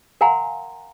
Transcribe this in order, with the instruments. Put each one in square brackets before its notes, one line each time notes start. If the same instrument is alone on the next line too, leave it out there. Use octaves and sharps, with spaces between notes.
[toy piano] A#4 F5 F#5 G#5 A#5 C6